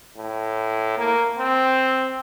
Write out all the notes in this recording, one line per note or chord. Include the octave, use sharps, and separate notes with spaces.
A2
A#3
C4